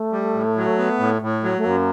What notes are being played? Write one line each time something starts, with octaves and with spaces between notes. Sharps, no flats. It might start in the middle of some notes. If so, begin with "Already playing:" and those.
Already playing: A3
G3
A2
F#3
B3
A2
A2
F#3
A3
F#2 A#3